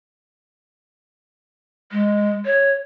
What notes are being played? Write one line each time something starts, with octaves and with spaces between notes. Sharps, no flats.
G#3
C#5